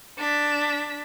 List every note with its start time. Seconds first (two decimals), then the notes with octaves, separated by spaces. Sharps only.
0.18 D4 B6